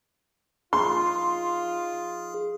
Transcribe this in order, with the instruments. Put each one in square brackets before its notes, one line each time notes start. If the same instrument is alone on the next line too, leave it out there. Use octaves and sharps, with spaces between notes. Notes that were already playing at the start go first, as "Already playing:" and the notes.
[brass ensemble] F3 D#4 F4 [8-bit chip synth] G#4 [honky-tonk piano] C6